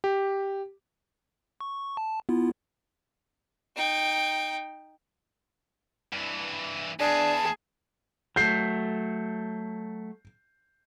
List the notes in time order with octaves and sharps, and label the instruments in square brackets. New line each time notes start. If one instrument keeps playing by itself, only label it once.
[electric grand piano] G4
[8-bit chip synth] C#6
A5
B3 E4 F4
[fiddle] D#4 G5
[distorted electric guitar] G2 E3
[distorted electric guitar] E2 [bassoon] D4 [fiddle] G#4 [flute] A5
[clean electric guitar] F#3 A3 [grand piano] G6 C7